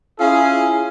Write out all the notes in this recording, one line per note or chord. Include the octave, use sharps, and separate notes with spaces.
C#4 E4 F4 G#4